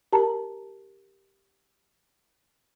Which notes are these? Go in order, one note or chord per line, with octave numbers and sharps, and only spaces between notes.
G4 A#4 A5 A#5